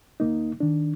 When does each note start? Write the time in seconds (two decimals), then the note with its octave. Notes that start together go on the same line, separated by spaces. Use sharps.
0.20 D2 A#3 D#4
0.60 D#3 D4